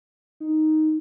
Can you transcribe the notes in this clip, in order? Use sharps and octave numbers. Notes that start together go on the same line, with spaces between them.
D#4